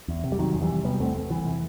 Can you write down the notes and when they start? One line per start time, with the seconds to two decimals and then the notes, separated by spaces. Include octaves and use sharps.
0.08 E2
0.24 C3
0.32 G3
0.39 C3 D#3 F#3
0.55 E2
0.62 E3 G3
0.69 C3
0.85 C3 G3 B3
1.00 E2 A3 C4
1.15 E2
1.31 E2 E3
1.46 C3